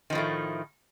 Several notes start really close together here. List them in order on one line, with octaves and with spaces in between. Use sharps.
D#3 F3 A2 A3